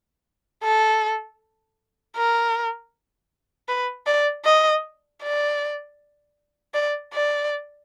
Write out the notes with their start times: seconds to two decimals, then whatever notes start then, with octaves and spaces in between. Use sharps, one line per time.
0.63 A4
2.16 A#4
3.68 B4
4.06 D5
4.45 D#5
5.22 D5
6.74 D5
7.13 D5